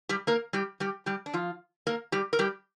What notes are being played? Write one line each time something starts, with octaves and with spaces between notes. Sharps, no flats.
G3 G4
A#3 A#4
G3 G4
G3 G4
G3 G4
D4
F3 F4
A#3 A#4
G3 G4
A#4
G3 G4